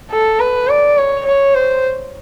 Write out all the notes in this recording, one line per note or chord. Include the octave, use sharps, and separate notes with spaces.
A4
B4
D5
C#5
C#5
C5